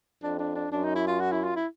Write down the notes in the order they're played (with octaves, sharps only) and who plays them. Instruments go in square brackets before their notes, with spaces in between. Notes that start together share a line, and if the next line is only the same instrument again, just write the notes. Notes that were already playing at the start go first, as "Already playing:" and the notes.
[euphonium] F2 [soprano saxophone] D4
[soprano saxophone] D4
D4
[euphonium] F#2 [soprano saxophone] D4
[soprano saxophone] D#4
E4
F4
F#4
E4
F4
E4